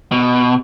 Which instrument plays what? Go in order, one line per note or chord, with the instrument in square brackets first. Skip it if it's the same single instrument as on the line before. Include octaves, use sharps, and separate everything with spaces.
[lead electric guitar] B2